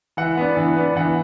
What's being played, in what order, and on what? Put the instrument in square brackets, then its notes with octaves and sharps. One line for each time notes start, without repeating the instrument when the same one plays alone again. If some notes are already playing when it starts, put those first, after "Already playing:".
[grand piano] E3 F#5
B3 D4
E3
B3 D4
E3 F#5